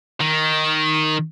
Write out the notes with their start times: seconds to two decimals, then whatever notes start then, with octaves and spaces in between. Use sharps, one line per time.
0.21 D#3